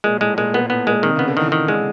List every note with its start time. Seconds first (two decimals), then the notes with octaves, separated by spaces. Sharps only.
0.04 A#2 G#3
0.21 A2 G#3
0.37 A#2 G#3
0.54 A#2 B3
0.70 A2 B3
0.87 A#2 G#3
1.03 C3 D#3
1.16 C#3 B3
1.28 D3
1.37 D#3 E3
1.52 D#3 E3
1.68 D3 G#3